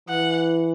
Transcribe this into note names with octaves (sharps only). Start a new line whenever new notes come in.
E3 F#5